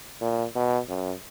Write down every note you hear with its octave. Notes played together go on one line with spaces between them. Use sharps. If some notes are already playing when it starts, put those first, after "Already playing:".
A#2
B2
F#2